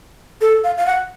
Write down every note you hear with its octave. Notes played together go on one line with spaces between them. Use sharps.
A4
F5
F5
F#5